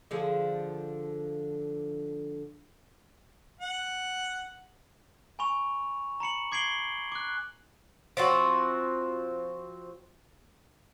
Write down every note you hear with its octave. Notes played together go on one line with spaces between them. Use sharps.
D3 F3 G#4
F#5
G#5 B5 C#6 F7
A#5 B5 C#7 F#7
D6 G#6 C7 D7 F#7 G7
D6 F#6
F3 C4 F#4